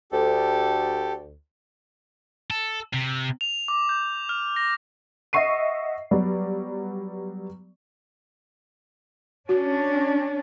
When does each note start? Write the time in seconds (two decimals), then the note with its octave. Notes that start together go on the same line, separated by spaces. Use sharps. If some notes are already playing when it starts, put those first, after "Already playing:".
0.12 D2 G4 A4
2.51 A4
2.94 C3
3.41 F7
3.68 D6
3.89 G6
4.29 F6
4.56 A#6
5.33 D#5 E5 F#5 C#6 C7 D#7
6.11 F#3 G3 B3 D5
9.49 C#4 D4 F#4